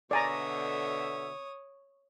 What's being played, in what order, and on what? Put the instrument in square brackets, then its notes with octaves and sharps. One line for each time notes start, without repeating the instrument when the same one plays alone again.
[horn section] B2 D3 E5 [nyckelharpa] C#5 D#6 [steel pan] D5 G#5 A#5